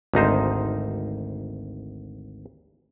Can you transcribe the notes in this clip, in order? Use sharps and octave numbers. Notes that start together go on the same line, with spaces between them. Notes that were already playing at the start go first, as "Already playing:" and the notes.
G#1 D2 D#4 C5